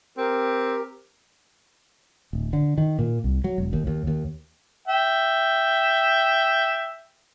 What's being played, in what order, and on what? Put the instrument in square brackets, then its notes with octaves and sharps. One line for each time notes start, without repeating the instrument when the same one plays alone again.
[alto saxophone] C4 [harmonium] G4 A#4
[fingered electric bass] D1
D3
D#3
A#2
C2
F#3
E1
D#2
D#2
D#2
[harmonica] E5 G5